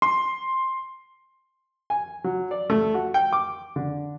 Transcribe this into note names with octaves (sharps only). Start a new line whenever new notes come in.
C6
G#5
F#3
D5
A3
F#4
G5
D6
D3